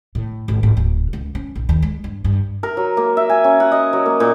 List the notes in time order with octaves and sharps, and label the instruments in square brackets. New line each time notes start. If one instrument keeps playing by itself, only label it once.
[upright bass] A2
G#1
G#1
D1
C#2
C#4
A#1
D#2
G#3
G2
G2
[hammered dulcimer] A#4
F#3
A#3
E5
G#5
C#4
F#5
D#5
F#3
A#3
A#2